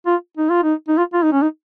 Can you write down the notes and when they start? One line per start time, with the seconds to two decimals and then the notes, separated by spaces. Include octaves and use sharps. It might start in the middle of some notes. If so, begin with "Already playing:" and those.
0.06 F4
0.37 D#4
0.50 F4
0.63 D#4
0.88 D#4
0.98 F4
1.13 F4
1.23 D#4
1.32 C#4
1.42 D#4